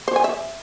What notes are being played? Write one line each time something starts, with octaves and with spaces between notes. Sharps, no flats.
C5
G#5
E5